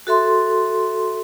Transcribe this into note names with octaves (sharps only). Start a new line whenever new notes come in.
F#4 A4 E5 C6